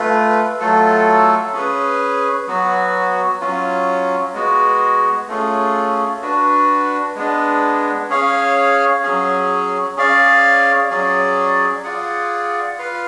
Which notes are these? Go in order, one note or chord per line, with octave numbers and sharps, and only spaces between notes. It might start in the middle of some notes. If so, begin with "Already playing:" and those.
Already playing: A3 F4 B4
F#3 A3 F4 A4
C#4 G#4 B4
F#3 B3 F#4
F#3 C#4 F4
G#3 B3 F#4
A3 C#4 F4 G#4
D4 F#4 B4
G#3 B3 D4
C#4 G#4 C#5 F5
F#3 C#4 G#4
C#4 G#4 D5 F5
F#3 C#4 G#4 D5
F4 G#4 D5 F#5
F4 B4 F5